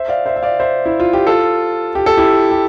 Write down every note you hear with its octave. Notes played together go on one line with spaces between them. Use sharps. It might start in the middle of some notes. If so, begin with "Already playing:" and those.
Already playing: C5 E5
D5 F5
C5 E5
E5
D5 F5
C5 E5
E4
F4
G4
F4 A4
G4
A4
E4 G4
G4